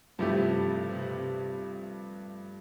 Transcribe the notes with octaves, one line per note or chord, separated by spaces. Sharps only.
G2 C3 F3 A3 E4 G4
C3